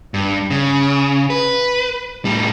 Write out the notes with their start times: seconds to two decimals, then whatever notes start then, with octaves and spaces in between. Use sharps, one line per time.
0.14 G2
0.51 C#3
1.30 B4
2.25 A2 G3